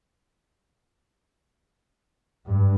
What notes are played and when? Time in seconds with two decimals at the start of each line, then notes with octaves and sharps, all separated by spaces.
2.47 G2